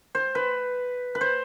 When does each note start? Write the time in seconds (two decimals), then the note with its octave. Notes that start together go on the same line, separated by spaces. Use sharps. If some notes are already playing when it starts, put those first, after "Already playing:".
0.15 C5
0.35 B4
1.15 B4
1.21 C5